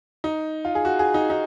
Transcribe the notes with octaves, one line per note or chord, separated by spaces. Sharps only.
D#4
F4
G#4
F#4
G#4
D#4
D#4